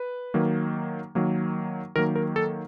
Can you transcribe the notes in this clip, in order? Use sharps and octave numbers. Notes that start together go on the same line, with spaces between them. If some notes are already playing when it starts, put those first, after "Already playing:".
Already playing: B4
D#3 F#3 A#3
D#3 F#3 A#3
D#3 F#3 A#3 A#4
A#4
A4